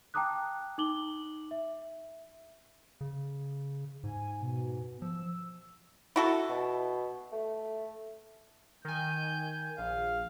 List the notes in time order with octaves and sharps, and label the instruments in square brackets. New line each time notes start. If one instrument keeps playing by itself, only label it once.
[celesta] G5 A5 A#5 D6 D#6 F#6
D#4 D6 F#7 G7
E5
[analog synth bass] C#3
[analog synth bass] G#2 [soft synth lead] G#5
[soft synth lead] B2
[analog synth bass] F3 [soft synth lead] E6
[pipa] E4 F#4 A4
[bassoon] B2
A3
[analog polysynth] D#3 G#5 [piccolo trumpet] G6
[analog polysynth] A#1 [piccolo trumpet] F5